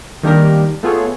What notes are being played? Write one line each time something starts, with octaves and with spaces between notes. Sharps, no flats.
D#3 G3 A#3 D4 G4 A#4
A3 B3 F4 G#4 A4 C#5